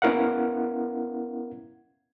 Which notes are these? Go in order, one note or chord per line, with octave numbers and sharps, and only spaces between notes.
B3 C#4 E4 A#4 F5 F#5